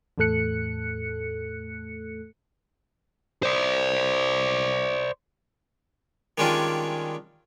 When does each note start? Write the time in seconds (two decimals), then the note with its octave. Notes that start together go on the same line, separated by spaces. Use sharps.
0.18 E2 A2 A3 A4 F#6 C#7
3.43 C5 D5
6.38 D#3 G3 G#3 C#4 D4 F4